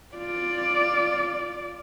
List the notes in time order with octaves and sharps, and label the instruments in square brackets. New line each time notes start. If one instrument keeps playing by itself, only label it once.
[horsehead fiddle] F4 D5